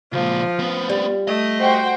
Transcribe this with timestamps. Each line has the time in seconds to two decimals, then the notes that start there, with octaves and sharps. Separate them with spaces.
0.13 C#2 A#2 F3
0.59 B3 C4
0.90 G3
1.27 A3 D#5
1.60 F#4 C5 G5